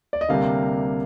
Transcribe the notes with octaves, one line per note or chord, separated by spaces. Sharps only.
D5
D#5
D2 C3 G3 A#3 D4 F5